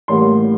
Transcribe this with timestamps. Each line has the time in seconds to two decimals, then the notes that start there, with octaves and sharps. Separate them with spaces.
0.08 A1 A2 G3 A#3 C6